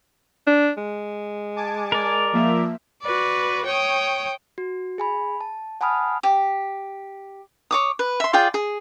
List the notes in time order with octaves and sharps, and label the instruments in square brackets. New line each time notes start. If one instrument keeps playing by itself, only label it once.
[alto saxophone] D4
G#3
[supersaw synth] G#5 A5 D6
[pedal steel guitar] A#4 D5
[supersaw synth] F3 A#3 E5
[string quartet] F#4 B4 D5
C#5 G5 C#6 D#6
[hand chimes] F#4
G#4 G#5 B5
A5
F#5 G#5 A5 B5 D#6 F6
[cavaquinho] G4
C#5 D6 D#6
B4
E5 C6
F4 G#4 D5 G5
G#4